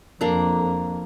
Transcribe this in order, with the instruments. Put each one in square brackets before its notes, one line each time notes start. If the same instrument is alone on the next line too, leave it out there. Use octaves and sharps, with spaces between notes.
[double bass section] F2 [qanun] A#3 D4 A#5